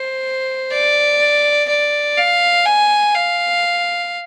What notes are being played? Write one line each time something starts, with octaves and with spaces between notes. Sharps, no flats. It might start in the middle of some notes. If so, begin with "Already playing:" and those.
Already playing: C5
D5
D5
F5
G#5
F5